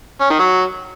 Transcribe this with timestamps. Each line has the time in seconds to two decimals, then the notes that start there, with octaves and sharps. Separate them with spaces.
0.21 C#4
0.30 D#3
0.39 F#3